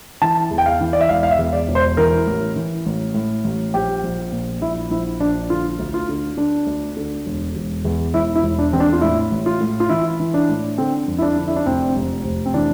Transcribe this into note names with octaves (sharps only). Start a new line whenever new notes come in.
E3 A5
E2
G5
F5
E3
D5
E5
E1 F5
F5
E5
E2
D5
E1
C5
E3 A#4
A1
E3
A1
A2
A1
A#1 G4
A#1
A#2
A#1 E4
A#1 E4
A#1 D4
D3 F4
D2
F4
D3
D3 D4
D2
D3
E1
E1
E2
E1 E4
E4
E1
D4
E2 C4
D4
F4
A2 E4
A1
F4
A2
F4
E3 E4
E3
D4
A2
D3 C4
F2
E4
D4
D3
E4
D4
F1 C4
F1
F1
C4
E3 D4